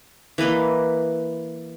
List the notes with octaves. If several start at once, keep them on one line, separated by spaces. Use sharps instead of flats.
E3 A#3 B4 D#5